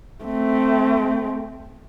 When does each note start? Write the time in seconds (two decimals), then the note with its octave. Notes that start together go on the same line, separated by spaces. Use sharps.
0.25 A3 C4